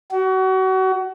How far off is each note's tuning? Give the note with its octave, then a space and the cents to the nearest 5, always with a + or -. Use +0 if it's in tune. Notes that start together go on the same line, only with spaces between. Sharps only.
F#4 +30